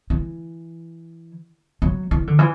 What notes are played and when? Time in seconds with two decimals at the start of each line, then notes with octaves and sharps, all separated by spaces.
0.10 E3
1.82 F#3
2.11 E3
2.27 D3
2.39 E3